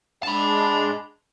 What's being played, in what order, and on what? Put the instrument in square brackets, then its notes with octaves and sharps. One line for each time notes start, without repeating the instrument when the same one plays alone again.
[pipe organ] G#3 D4 [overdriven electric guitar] A5 B5